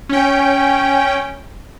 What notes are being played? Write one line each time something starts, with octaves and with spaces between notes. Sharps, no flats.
C#4 G5